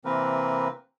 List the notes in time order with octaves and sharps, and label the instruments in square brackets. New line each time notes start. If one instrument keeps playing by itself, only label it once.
[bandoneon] C3 E3 A#3 C4 A#4 B4